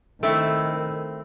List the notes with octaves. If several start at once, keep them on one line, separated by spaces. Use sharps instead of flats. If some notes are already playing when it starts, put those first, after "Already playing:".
D#3 A3 C4 E4